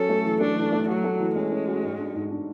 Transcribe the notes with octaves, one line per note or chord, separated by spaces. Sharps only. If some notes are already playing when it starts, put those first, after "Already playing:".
Already playing: F#3 C#4 A4
A3
E3
A3 D4
E3
A3
F#3 F#4
A3
E3
G#3 C#4
C#4
F#4
G#2
D4
G#2
D4